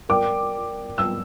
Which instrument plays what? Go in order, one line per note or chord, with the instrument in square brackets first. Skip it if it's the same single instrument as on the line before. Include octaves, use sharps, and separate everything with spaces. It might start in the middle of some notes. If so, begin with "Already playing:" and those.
[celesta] A#4 D5 G5 [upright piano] D6
[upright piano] E6